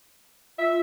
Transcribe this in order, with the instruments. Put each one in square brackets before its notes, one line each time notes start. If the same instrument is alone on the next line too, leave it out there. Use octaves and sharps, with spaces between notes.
[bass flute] F4 [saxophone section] E5